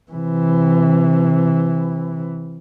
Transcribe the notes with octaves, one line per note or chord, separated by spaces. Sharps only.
C3 E3